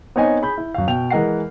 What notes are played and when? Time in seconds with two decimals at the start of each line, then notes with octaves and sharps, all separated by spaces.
0.16 B3 C4 D#4 C#5 D#5 G#5
0.42 G#4 B5 G6
0.58 E4
0.74 F#2 F5
0.87 B2 G5 F7
1.10 E3 G#3 A#4 D#5 F#5 C7